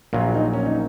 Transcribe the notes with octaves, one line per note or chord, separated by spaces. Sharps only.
A#1 A#2 F#3 F4
D#4
C#4
D#4